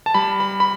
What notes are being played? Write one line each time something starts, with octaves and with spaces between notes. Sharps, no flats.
A5
G3 B5
B5
B5